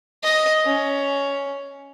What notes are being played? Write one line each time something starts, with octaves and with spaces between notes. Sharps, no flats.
D#5
C#4